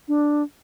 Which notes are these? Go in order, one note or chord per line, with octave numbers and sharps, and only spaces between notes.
D4